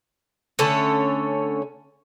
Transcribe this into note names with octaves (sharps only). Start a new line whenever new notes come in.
D3 A3 C#4